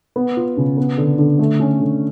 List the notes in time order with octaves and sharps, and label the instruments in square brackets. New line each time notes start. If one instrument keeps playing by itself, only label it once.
[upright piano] B3
F4
C#3
B3
D3
D3
A3
C#4
D3